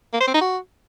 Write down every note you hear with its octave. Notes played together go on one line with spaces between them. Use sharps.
A#3
C5
C4
D#4
F#4